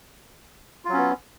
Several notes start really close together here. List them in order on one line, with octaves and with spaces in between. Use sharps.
F4 F#3 C#4 B3